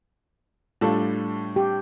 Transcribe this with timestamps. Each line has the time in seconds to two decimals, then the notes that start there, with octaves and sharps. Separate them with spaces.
0.81 A2 G3 D4 F4 A4
1.56 G4